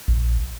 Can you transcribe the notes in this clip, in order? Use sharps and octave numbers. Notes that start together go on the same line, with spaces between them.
A#1